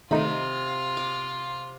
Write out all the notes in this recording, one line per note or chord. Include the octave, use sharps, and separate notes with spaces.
C3 D#3 A3 D#4 F4 B5
D6